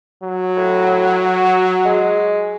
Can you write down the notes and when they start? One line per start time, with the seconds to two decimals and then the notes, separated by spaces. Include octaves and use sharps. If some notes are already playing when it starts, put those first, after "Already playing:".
0.23 F#3
0.57 A2
1.34 F#4
1.85 G#3